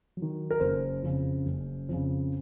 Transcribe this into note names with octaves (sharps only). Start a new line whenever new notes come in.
F#3
D#3
A#4
F#1 C5
F2 C#3
F#1
F2 C#3